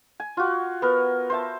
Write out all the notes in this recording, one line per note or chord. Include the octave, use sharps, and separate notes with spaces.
G#5
F4 F#4
B3 A#4
C5 E5 A5